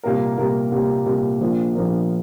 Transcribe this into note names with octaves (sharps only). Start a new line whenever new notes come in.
C2 A#2 A#3 G4 A#4
C2 A#2 A#3 G4 A#4
C2 A#2 A#3 G4 A#4
C2 A#2 A#3 G4 A#4
A#1 A#2 F3 D4 A#4
A#1 A#2 F3 D4 A#4